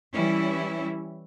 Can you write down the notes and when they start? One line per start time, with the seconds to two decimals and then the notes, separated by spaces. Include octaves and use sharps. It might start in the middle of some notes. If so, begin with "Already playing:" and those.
0.14 E3 G3 C#4 E4